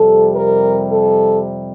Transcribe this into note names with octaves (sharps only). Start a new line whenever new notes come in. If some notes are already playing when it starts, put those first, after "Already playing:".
Already playing: F2 C3 G3 A4
A#4
A4